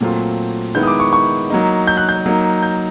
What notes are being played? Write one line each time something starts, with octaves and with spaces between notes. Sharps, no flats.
A#2 F#3 A3 C4 F4
D#3 G#3 B3 E4 G6
D#6
D6
C#6
C#6
F#3 A#3 D#4
G6
F#6
G6
F#3 A#3 D#4
G6